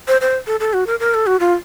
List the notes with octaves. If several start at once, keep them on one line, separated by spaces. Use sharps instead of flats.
C5
C5
A4
A4
F#4
A#4
A#4
A4
F#4
F4